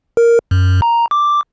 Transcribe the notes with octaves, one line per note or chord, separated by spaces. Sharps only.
A#4
F#2
A#5
D6